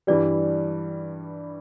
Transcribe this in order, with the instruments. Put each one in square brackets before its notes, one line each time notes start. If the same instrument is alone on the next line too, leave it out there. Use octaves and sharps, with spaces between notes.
[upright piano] G2 E3 G3 [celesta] D5